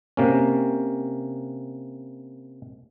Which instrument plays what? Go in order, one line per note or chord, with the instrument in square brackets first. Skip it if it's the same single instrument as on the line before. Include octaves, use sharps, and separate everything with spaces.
[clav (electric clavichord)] C3 A#3 C#4